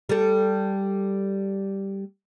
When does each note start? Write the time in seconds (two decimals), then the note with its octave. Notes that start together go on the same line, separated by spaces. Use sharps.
0.09 G3 A4